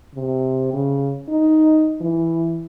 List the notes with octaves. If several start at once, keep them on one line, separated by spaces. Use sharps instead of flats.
C3
C#3
D#4
E3